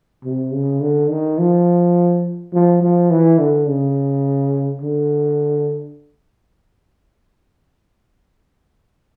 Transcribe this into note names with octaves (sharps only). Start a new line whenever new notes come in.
C3
C#3
D3
D#3
F3
F3
F3
E3
D3
C#3
D3